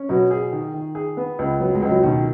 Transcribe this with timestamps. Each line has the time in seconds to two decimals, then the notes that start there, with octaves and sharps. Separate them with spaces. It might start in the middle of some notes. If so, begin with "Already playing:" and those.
Already playing: C#4
0.09 B2 F#3
0.31 G#4
0.52 D#3
0.74 D#3
0.95 G#4
1.17 B3
1.39 C#2
1.60 F#3 B3
1.75 G#3
1.82 C#2
1.88 F#3
2.03 B2 D#3